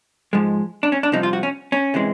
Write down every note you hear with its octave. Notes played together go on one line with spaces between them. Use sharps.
G#2 F3 G#3
D4
C#4
D4
C2 C3 F3 D#4
F4
F#4
C#4
C#4
C3 E3 G#3